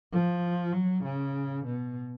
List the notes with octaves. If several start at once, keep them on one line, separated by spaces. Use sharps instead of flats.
F3
F#3
C#3
B2